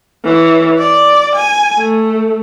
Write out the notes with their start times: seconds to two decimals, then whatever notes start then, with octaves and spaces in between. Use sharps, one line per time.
0.24 E3 C#5
0.78 D5
1.36 G#5
1.78 A3